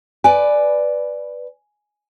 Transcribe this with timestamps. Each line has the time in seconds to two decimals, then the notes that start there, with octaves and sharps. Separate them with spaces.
0.24 B4 D5 G#5